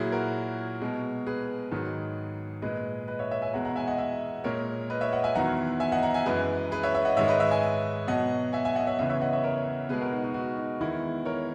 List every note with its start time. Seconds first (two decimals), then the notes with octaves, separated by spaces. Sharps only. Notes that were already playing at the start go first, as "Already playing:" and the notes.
Already playing: A#2 F#3 E4 G#4
0.12 F#4 A#4
0.82 B2 G#3
1.27 G#4 B4
1.72 G#2 D#3 F#3
2.62 A#2 G#3 B4 D#5
3.08 B4 D#5
3.19 C#5 E5
3.31 C#5 E5
3.42 E5 G#5
3.53 E2 B2 G#3 F#5 A#5
3.65 F#5 A#5
3.76 E5 G#5
3.87 D#5 F#5
3.98 E5 G#5
4.44 A#2 G#3 A#4 C#5
4.90 B4 D#5
5.01 C#5 E5
5.13 D#5 F#5
5.24 E5 G#5
5.35 E2 D#3 F#3 F#5 A#5
5.80 E5 G#5
5.92 D#5 F#5
6.03 F#5 A#5
6.14 E5 G#5
6.26 F#2 E3 G#3 G#4 B4
6.72 G#4 B4
6.83 C#5 E5
6.95 C#5 E5
7.05 D#5 F#5
7.17 G#2 D#3 G#3 C#5 E5
7.28 B4 D#5
7.39 C#5 E5
7.51 E5 G#5
8.07 B2 F#3 D#5 F#5
8.53 E5 G#5
8.65 E5 G#5
8.75 D#5 F#5
8.87 C#5 E5
8.98 E2 C#3 E3 C#5 E5
9.09 C#5 E5
9.21 D#5 F#5
9.33 C#5 E5
9.44 A#4 C#5
9.89 B2 G#3 G#4 B4
10.01 F#4 A#4
10.13 D#4 F#4
10.24 D#4 F#4
10.34 D#4 F#4
10.57 D#4 F#4
10.81 E2 D#3 G#3 E4
11.25 A#4 C#5